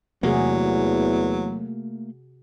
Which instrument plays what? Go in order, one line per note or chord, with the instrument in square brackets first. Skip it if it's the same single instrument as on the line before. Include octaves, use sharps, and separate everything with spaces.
[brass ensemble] E2 [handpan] C3 F#4 G#4 [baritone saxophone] F#3 [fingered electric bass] A3 A#3